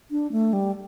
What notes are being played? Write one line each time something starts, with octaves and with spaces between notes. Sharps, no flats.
D4
A3
G3